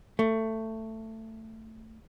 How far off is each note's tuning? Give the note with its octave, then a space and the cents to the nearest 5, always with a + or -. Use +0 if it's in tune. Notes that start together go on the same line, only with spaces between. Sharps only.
A3 +15